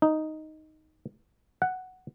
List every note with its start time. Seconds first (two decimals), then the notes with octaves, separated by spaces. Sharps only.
0.02 D#4
1.62 F#5